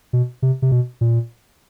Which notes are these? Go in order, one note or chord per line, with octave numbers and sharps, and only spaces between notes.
B2
C3
C3
B2
A#2